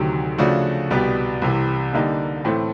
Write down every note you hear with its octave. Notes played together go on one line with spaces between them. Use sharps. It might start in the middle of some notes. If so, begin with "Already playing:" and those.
Already playing: D2 C3 D#3 F#3
C#3 F3 A3 D4 F#4
C2 B2 G3 B3
C2 C3 E3
D3 G3 A#3 D#4
A2 E3 A3 C4